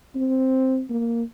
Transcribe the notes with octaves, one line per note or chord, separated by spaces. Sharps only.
C4
A#3